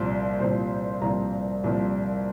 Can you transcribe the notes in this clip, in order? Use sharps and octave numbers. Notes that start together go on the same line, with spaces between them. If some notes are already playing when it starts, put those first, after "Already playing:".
Already playing: C2 A#2 F3
C2 A#2 F3 C5
C2 A#2 F3 A#5
C2 A#2 F3